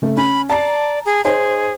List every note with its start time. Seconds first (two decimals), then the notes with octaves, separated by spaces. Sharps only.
0.02 C#3 A3
0.17 C#4 B5
0.50 D5 A5 A#5 C7
1.06 G#4
1.24 D#4 G#4 C5 C#5